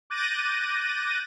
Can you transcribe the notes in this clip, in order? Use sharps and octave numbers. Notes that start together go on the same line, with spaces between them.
D6 F#6 G6 A6 A#6 D#7